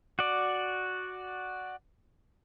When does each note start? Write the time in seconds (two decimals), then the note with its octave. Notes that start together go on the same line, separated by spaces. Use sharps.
0.19 F#4 D5